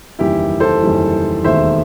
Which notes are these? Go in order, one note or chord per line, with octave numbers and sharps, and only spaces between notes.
F#1 E2 D#3 G3 E4 G4
A4 C5
F#1 E2 D#3 G3
E1 D#2 D#3 A3 C5 E5